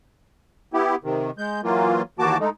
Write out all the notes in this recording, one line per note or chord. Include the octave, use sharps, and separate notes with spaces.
B3 E4 G4
C3 D#3
G#3 G6
E3 F#3 A#3 F4
D#2 E3 A#3 F#4 A5 D6
G#3 A3 D#4